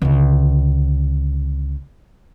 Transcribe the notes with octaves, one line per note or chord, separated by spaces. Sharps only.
C#2 D3